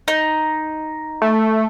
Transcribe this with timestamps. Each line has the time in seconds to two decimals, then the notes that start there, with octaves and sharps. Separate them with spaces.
0.08 D#4
1.22 A3